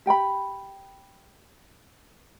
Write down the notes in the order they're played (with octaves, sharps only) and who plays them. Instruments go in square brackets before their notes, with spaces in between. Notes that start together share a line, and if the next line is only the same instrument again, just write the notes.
[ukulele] G4 G5 A#5 B5